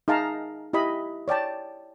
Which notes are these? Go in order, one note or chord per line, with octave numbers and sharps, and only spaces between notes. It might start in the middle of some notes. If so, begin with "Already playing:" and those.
D#4 G#4 E5 F5 A5 A#5
E4 G4 D#5 B5
C#5 D5 G5 A5